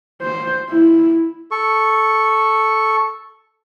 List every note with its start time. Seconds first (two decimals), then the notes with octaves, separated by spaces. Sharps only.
0.22 C5
0.70 E4
1.51 A4 C#6